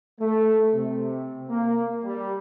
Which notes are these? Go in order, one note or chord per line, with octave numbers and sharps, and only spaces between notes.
A3
C3
A#3
G3